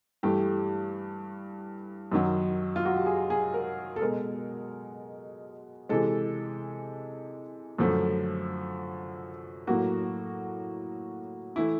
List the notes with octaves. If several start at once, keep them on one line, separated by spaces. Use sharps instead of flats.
G2 E3 A3 G4
F#2 D#3 F#3
F4
F#4
G4
G#4
G#4
A#4
A4
B2 G#3 A#4
C3 E3 G#3 A4
F#2 D3 F3 A3
A2 F#3 A#3 F#4
E3 A3 E4